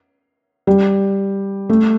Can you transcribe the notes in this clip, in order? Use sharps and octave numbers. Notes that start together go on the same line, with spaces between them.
G3
A3